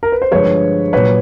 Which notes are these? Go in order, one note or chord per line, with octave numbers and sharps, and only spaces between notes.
A#4
B4
C5
G2 D3 F3 G#3 B4 C#5
A#2 F#3 B4 C#5